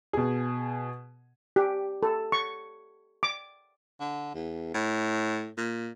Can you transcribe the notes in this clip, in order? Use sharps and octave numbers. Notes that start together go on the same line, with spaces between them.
B2 G#4
G4
A4
C#6
D6
D3
E2
A2
A#2